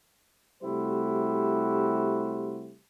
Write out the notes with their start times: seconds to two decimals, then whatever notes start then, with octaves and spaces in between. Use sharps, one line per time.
0.62 C3 G3 A3 E4 F#4 C5